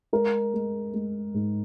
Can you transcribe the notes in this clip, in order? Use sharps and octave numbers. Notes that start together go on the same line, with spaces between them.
G#3 A#4
G#3
G#3
G#2